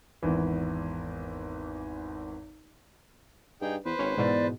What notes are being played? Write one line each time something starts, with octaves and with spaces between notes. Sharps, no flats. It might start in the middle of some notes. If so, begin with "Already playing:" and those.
G#1 E2 E3
G2 D#4 G#4 G5
E2 B4 C5
G#1 C#4
E2 G#2 B2 D5